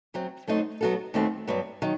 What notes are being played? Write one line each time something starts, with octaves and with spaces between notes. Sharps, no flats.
F#2 F#3 C4
F#3 A3 D#4 F#4 C5
F#3 B3 F#4 A4
D#2 D#3 A3 C4 F#4
G2 F#3 B3
D#3 F#3